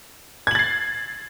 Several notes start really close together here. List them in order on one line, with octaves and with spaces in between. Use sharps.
G#6 F#7 A6 C7